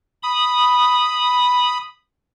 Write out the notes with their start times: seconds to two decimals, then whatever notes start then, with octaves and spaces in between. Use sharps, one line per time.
0.23 B5 D#6